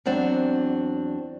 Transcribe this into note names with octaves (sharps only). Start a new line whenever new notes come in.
E2 F#3 C4 D4